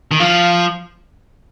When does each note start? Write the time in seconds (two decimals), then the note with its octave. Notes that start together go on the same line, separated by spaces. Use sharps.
0.11 D#3
0.20 F3 F5